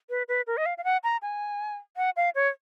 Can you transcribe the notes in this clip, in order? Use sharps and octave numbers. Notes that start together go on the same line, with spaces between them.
B4
B4
A#4
D#5
F5
F5
F#5
A#5
G#5
F#5
F5
C#5